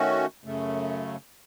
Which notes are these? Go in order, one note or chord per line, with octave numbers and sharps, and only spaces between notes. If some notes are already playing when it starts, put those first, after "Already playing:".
Already playing: D#3 A3 C#4 F#4
F#2 C#3 A3